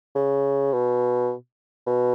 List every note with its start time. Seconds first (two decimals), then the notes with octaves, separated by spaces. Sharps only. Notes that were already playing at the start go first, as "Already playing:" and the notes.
0.15 C#3
0.73 B2
1.87 B2